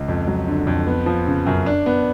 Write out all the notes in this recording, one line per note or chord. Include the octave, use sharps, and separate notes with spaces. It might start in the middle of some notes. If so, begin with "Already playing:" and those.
Already playing: C#2
F2
F#3
D3
F2
B3
F3
C#3
F#2
D4
B3